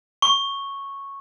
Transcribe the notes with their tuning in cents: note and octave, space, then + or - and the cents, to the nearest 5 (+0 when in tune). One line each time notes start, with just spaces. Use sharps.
C#6 -5